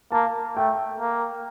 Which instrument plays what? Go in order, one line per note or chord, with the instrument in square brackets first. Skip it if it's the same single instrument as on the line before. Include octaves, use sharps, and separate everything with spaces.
[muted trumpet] A#3 [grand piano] A5
[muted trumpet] A3 [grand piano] G5
[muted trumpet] A#3